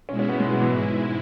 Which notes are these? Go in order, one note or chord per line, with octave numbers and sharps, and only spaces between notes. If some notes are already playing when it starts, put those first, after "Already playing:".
B2 G#3 C#4 E4
C#4
B3
G#3
F#3
E3
G#2 G#3 E4